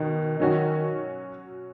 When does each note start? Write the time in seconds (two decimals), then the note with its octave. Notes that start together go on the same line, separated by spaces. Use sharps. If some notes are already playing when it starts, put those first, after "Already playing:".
Already playing: B2 D#3
0.39 D#3 F#3 C#4 F#4